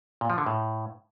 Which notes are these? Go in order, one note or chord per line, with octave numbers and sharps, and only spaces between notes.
A#2
F3
D3
A2